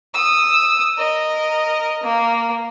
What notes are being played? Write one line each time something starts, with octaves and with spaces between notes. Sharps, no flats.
D#6 E6
A#4 D#5
A#3